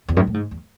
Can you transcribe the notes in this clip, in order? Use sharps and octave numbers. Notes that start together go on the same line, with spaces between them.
E2
F#2
A2
G#2
E2